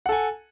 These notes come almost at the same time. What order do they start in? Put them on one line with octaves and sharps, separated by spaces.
F#5 A4 G#5